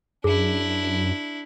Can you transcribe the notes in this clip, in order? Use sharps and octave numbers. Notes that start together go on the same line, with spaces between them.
F#2 D4 E4 G#4